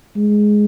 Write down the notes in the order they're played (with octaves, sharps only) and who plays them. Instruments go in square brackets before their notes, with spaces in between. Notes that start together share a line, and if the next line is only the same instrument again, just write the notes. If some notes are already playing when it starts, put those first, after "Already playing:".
[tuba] G#3